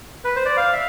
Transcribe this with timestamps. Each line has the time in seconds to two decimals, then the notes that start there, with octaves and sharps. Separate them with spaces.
0.25 B4
0.36 C5
0.45 D5
0.57 F5
0.73 E5